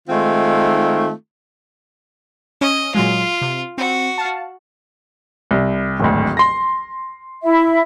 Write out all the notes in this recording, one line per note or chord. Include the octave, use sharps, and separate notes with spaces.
D#3 G#3 A3 C4 D#4 F4
C#4 D#5
A#2 F#3 G#3 F4
C3
C4 F#4
F5 A5
C2
D1 G#1 D2
C6 A#6
E4 E5